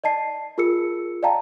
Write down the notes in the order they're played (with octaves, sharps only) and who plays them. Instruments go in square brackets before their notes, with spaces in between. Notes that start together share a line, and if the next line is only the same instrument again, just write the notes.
[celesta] D5 D#5 A5 C7
F4 G#4 A#4 E6 C#7
D5 D#5 F5 G5 A5 A#5